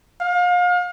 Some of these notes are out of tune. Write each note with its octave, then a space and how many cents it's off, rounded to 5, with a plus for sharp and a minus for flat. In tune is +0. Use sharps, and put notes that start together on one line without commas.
F5 +35